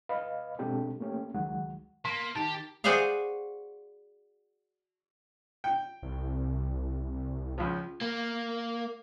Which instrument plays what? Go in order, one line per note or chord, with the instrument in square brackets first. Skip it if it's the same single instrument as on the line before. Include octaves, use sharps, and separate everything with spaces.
[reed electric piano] B4 D#5 F5 B5
B2 G#3 C4 D4 G4 A4
A3 A#3 C#4 G4
C#2 D#3 F#3 G#3 F#5
[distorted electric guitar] A#3 [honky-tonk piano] C6 [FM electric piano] B6
[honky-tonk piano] D#3 [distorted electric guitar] G4 [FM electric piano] A5
[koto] F#4 G#4 C5 D5 E5 F5
[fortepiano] G5
[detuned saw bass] C2
[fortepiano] C#2 F3
[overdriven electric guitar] A#3